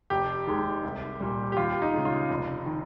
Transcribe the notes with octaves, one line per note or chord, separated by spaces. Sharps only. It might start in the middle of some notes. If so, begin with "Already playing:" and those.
F1 G4
D#2 D#3 G#3
C2
A#2 G3
G4
D#2 F4
D#4
C#3 G#3
F4
F1
D#3